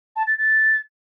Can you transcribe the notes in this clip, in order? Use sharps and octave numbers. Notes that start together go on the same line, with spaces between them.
A5
A6
A6